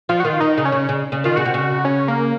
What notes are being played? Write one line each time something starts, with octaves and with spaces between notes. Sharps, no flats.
F3 F4
F#4
D#3 F4
D#3 D#4
C#3
C#4
C#3
C#3
C#3
D#3 F4
C#3 F#4
C3
C#3
C#4
A#3